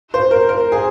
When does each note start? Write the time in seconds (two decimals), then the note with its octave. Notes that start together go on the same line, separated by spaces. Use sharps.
0.14 C5
0.31 A#4
0.49 A#4
0.72 G#4